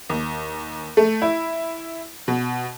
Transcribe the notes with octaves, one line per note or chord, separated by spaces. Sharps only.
D#2
A3
E4
B2